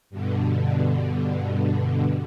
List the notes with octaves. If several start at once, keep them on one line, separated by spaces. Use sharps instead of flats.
G2 B2 D3